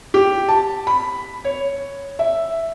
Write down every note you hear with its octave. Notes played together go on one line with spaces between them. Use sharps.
G4
A5
B5
C#5
E5